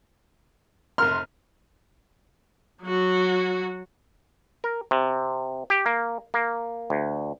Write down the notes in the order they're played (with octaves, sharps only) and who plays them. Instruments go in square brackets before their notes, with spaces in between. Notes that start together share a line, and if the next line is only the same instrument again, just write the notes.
[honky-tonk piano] F1 A#4 C6 [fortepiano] F6
[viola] F#3 F#4
[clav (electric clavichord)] A#4
C3
G4
A#3
A#3
D2